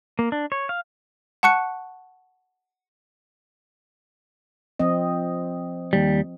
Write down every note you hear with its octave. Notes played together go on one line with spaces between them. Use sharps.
A#3
D4
C#5
F5
F#5 A5 C#6 F#6 C#7
F3 C4 D#5
D#2 G3